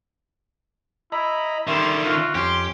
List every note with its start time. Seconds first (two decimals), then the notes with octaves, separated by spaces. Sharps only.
1.12 E4 D#5 A#5 B5
1.68 D3 D#3 G3 E5 C6
2.04 F4 F#4
2.35 F2 C#4 G4 C6